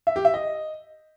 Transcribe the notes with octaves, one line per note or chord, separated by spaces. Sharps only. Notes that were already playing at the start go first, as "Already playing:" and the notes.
E5
G4
E5
D#5